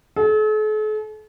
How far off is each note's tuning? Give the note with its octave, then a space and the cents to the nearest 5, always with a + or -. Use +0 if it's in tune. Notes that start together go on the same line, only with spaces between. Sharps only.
A4 -45